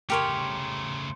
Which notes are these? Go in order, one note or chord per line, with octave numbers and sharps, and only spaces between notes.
C#3 A3 G4 A#4 C#5 C6 C#7